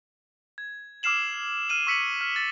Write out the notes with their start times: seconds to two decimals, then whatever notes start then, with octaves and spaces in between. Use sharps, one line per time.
0.58 G#6
1.03 D6 E6 F6 C7 E7 F#7
1.69 F6 D#7 F#7
1.87 C#6 E6 B6 C#7 D#7 F#7
2.21 F6
2.36 A6